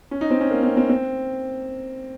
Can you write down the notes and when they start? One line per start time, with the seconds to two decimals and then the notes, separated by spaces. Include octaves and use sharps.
0.11 C#4
0.21 D#4
0.31 C4
0.40 C#4
0.51 A#3
0.63 C4
0.77 C4
0.89 C4